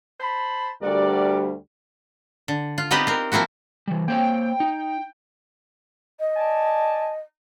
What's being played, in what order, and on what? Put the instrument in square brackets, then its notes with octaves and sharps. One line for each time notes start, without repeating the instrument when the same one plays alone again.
[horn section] C5 A5 B5
[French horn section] D2 G3 [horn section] F#4 A#4 D5
[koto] D3
F4
B3 C4 D#4 G4 B4 D#5
C4 A#4
F3 A#3 C4 E4 F#4
[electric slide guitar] E3 G3
[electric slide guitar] A#3 C5 C#5 [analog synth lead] G5
[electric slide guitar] D#4
[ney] D#5
[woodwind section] D5 G#5 A5